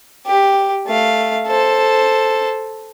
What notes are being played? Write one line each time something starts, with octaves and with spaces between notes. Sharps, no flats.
G4
A3 F5
A4 C5